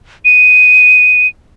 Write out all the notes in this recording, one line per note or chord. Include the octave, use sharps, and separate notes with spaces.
D#7